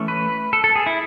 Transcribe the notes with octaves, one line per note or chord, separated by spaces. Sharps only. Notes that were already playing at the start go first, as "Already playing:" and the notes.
Already playing: E3 A3 C#4
B4
A4
A4
G#4
E4